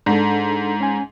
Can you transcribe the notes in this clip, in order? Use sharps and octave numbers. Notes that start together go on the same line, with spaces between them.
G#2 D4 A4
C#4 G#5